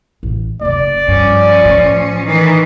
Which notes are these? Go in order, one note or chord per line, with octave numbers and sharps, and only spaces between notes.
A1
F#1 C#3 D5
G2 F3 C#4
A2
D#3 E3